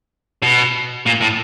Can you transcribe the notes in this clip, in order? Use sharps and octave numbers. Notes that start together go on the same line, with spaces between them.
B2
A#2
A2